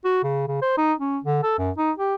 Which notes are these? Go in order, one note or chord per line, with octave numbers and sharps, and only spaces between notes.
F#4
C#3
C#3
C5
D#4
C#4
D3
A4
F#2
D#4
G4